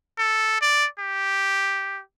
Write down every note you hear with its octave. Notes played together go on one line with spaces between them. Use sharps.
A4
D5
G4